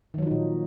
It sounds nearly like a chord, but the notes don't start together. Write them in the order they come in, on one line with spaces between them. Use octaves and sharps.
D#3 F#3 F3 D#4 A#2